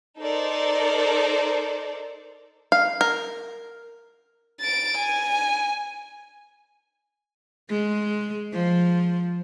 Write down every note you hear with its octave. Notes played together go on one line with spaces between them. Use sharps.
D#4 A4 A#4 C5 D5
F5
A#4
A6 D7
G#5
G#3
F3